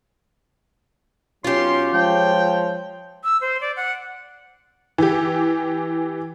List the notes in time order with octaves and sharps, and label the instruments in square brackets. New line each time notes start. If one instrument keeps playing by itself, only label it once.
[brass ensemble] B1 F#3 C#4 [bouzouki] F4 G4 [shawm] C6
[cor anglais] F3 [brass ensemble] G#3 C#5 [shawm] G5
[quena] E6
C5
D5
F#5
[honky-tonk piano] E3 G4